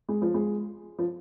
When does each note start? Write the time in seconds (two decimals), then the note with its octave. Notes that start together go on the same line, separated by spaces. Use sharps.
0.09 G#3
0.22 F3
0.34 G#3
0.99 F3